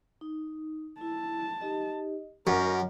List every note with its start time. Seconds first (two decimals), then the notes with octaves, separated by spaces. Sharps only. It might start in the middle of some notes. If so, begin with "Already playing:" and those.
0.21 D#4
1.01 E4 A5
1.61 D#4 G4 D#5
2.47 F#2 A#4 D#5 F#5 D6